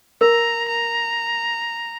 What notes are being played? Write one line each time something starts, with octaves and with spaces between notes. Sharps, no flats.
A#4 A#5
A#5